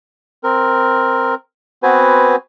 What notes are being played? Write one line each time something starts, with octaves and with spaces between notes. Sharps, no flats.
C4 A#4
B3 C4 F#4 B4 C5 G#5